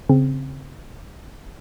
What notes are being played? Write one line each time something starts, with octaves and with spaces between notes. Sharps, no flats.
C#3 C4